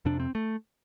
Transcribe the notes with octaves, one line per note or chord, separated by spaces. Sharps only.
F2 C3 D4
C4
A3